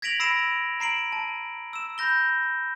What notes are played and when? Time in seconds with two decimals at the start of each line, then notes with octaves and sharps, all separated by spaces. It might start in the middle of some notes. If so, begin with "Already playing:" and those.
0.02 G#6 A#6 B6 D7 F7 F#7
0.20 B5 E6 A#6 C7 D7 E7
0.80 A#5 C7 D7 F#7
1.12 A5
1.73 E6 E7
1.98 B5 G6 A#6 G7